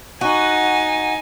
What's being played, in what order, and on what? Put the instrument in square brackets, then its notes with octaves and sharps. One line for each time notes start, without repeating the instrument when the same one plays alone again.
[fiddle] D#4 G#5 [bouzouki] F#4